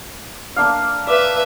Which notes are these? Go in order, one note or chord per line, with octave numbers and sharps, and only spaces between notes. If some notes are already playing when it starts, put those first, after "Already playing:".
A#3 D4 F5
B4 D5 E5